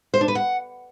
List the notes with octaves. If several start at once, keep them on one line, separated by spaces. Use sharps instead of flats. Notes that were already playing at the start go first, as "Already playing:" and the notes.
C5
D4
B4
F#5